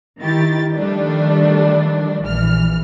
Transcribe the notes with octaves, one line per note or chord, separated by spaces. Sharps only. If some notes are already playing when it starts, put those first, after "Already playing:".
D#3 E4 G4 A6
D#3 F3 G3 A3 D4
A#1 E3 F6